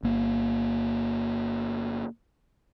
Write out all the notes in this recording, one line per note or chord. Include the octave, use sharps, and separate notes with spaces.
G1 A#3